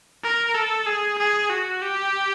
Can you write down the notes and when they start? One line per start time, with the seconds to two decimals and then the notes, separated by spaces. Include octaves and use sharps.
0.24 A#4
0.54 A4
0.86 G#4
1.18 G#4
1.50 F#4
1.81 G4